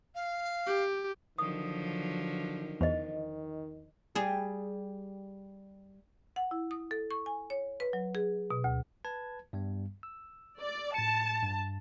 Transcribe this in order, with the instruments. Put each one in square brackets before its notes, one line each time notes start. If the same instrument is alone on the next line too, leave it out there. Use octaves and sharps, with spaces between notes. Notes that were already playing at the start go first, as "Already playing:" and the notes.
[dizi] F5
[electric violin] G4
[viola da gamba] D3 F3 F#3 [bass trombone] D#3 [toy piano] D#6
[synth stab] E2 [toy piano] C5 D#5
[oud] G3 G#4
[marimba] F#5
E4
D#6
A4
C#6
G#5
C#5
B4
F#3
G#4
B2
D2
[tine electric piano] B4 A5 G#6
G2 G3 B3
E6
[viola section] D5
[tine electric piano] A2 C#7 [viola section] A5
[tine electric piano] G2